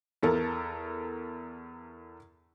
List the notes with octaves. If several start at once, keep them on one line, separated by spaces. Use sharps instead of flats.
E2 A4 A#4